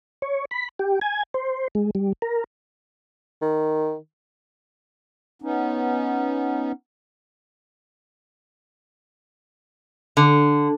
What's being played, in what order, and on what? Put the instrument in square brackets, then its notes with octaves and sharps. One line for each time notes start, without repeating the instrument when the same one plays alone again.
[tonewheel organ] C#5
B5
G4
G#5
C5
G#3
G3
A#4
[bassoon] D#3
[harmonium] B3 C#4 D#4
[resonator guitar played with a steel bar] D3